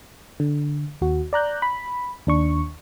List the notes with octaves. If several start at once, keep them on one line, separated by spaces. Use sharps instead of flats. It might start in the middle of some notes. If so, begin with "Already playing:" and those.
D3
D#2 F#4
D5 A#5 F#6 G6
B5
D#2 D4 C#6